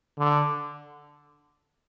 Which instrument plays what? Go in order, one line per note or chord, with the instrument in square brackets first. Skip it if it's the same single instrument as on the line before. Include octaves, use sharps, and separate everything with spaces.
[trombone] D3